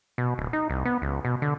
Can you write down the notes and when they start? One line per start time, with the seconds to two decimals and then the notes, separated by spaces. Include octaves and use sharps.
0.18 B2
0.38 D1
0.53 D#4
0.70 C2
0.85 B3
1.02 C#2
1.25 B2
1.42 D3